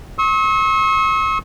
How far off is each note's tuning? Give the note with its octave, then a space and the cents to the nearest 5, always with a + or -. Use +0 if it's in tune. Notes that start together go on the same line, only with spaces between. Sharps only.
C#6 -40 E6 -45